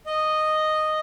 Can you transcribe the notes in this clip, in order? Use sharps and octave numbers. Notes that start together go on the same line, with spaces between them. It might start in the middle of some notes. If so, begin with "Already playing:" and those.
D#5